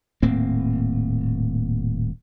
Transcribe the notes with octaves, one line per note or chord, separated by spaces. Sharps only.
D#1 A2 A#3 C4